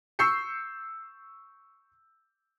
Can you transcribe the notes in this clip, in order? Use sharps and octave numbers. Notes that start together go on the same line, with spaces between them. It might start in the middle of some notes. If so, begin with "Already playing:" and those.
C#6 E6 G6 C7 C#7